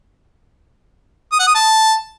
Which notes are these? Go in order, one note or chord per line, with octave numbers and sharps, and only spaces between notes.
D#6
F#5
D#6
A5